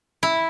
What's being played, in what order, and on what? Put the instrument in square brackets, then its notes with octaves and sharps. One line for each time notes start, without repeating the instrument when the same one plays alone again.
[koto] E4